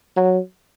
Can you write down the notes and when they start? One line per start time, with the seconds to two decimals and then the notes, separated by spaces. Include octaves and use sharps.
0.17 F#3